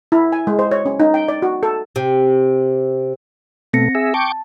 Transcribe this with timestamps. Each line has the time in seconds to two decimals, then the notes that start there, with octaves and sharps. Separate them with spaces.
0.12 E4
0.32 G#5
0.47 G#3
0.59 C5
0.71 C#5
0.86 C#4
1.00 D#4
1.14 G5
1.28 D5
1.42 F#4
1.63 A4
1.96 C3
3.73 B2 A3 C4 A#6 C#7
3.95 G#4 E5
4.14 G5 A5 C#6 D6